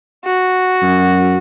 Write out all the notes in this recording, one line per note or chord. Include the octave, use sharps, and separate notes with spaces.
F#4
F#2